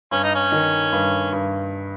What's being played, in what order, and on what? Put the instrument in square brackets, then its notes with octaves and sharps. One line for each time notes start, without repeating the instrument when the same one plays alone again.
[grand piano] G2 [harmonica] C#4
[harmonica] D#4
C#4
[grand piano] D#3
G2
G2